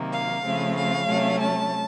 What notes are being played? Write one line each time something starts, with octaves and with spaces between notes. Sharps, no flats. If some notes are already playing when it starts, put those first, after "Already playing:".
Already playing: C3 D#3 F#3 A#3
F5
C#3 F3 A3 C4
F5
C3 F#3 A3 C#4
A5